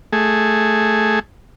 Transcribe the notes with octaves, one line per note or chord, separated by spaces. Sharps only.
A3 G#4